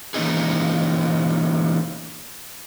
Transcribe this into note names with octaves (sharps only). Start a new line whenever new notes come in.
E3 A#3 C#4 D#4 G#4